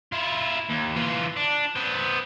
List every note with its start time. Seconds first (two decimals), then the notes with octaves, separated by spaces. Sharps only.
0.12 E4 F4
0.69 D#2
0.96 E3 F4
1.36 D4
1.76 B3 C5